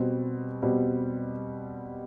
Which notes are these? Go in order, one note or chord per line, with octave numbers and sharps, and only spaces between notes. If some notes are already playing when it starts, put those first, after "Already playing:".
Already playing: B2 G3 C4
B2 G3 C4